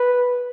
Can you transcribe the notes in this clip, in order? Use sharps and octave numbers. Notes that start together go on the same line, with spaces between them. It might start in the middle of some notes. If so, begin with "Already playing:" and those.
Already playing: B4